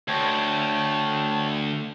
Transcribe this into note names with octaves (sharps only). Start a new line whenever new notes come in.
D2 C#5 G5 A5